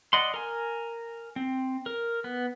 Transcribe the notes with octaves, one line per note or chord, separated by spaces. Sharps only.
D5 D#5 F#5 C6
A#4 G#5
C4
A#4
B3